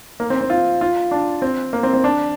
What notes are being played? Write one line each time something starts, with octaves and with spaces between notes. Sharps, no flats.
A#3
C4
C4
F4
F4
D4
C4
A#3
C4
C4
D4